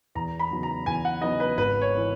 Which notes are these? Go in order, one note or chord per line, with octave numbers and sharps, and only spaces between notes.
E2 A#5
B5
C#3 F#3 B3 D#4
A#5
E2 G#5
F#5
C#3 F#3 B3 D#4 D#5
B4
G#1 B4
C#5
E3